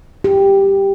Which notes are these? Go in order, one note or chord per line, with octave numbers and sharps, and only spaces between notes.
G4